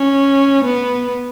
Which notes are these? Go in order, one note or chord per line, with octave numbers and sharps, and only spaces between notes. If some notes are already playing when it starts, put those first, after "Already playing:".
Already playing: C#4
B3